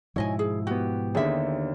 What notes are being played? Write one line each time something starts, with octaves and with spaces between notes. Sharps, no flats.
G#2 B2 F3 E4 C#5 D#5 G#5
G#4
B3 F#4 G4
D#2 D3 G#4 E5